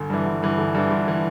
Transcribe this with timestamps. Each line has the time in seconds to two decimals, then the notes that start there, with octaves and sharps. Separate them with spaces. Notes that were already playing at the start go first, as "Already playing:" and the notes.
Already playing: G1
0.10 G2 E3
0.25 G1
0.43 G2 E3
0.57 G1
0.74 G2 E3
0.90 G1
1.08 E3